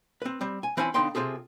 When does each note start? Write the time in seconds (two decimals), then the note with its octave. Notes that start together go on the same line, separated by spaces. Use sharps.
0.22 C4 B4
0.41 G3 C4
0.63 G#5
0.77 E3 C4 C#4 E4 G#5 A5
0.94 D3 B3 D#4 F5 G5 C6
1.15 C3 C4 F4 G#4 A4